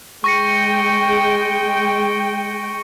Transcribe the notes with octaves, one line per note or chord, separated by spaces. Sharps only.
G#3 G5 C#6 A#6 C#7